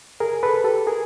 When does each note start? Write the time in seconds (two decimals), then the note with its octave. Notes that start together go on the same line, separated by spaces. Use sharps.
0.20 G#4 A#4
0.43 A4 B4
0.64 G4 A4
0.87 G#4 A#4